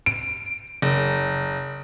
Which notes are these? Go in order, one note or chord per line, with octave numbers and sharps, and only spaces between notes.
D7
F#1